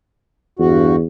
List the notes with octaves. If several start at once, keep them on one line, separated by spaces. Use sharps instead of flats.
E2 G2 F#4